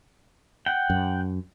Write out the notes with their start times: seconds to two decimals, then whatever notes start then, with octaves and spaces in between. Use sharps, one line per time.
0.66 F#5 G5
0.90 F#2